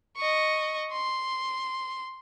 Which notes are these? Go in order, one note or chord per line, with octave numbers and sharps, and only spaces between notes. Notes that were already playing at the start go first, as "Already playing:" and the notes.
D#5 C#6
C6